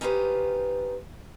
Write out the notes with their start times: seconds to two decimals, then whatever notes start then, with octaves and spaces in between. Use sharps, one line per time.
0.01 C#4 D#4 F4 G4 B4 C5